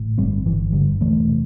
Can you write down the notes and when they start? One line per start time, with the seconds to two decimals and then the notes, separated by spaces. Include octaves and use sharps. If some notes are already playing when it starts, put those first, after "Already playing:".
Already playing: A1 A2
0.17 G1 G3 C4
0.46 G1 E3
0.72 G2 D3 G3
1.01 E1 E3 A3
1.28 C3